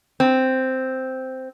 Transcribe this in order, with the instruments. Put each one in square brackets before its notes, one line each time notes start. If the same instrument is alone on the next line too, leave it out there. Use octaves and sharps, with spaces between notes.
[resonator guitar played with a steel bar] C4